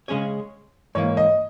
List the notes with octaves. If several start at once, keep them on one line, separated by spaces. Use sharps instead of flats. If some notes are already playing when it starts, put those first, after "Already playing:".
C#3 G#3 C#4 G#4 C#5
G#2 E3 A#3 C#5
D#5